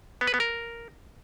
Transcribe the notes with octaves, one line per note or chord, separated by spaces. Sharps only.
B3
B4
B3
A#4